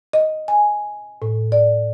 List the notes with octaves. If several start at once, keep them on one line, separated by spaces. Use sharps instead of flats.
D#5
G#5
A2
D5